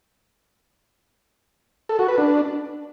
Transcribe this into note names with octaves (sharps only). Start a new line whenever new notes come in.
A4
F#4
B4
D4